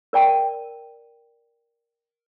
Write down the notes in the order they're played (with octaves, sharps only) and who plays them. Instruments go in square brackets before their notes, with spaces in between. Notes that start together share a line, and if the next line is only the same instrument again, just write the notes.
[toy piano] A#4 D5 G5 A5